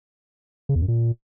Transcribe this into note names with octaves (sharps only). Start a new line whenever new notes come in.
C#3
E2
F#2
A#2